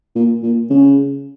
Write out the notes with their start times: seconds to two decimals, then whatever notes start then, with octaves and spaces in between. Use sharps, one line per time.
0.15 A#2
0.42 A#2
0.70 C#3